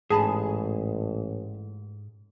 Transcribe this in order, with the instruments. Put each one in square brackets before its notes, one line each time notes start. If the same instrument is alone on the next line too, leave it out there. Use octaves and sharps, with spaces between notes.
[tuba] A1 [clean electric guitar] G#2 [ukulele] D#4 A5 B5 [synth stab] G#4